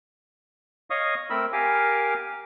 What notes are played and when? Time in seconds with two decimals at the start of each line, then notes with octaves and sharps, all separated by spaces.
0.90 C#5 D#5 F5 C#6 D#6
1.30 A3 C4 A#4 B5 E6
1.53 G4 A#4 F5 G#5 D6